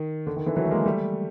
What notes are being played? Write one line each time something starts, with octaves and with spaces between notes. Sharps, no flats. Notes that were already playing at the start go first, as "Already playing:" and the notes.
Already playing: D#3
D3
D#3
D3 E3
E3 F#3
A3
G#3 A#3
G3 A3